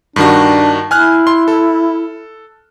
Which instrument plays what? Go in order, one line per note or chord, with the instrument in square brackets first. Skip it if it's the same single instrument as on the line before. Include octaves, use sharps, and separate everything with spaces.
[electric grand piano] G2 D#3 F#4 [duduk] D4
[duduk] E4 [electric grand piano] G#5 F6 F#6
[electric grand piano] C6
A4